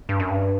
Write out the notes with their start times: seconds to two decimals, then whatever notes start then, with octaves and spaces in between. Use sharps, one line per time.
0.09 G2
0.20 F#2
0.30 G2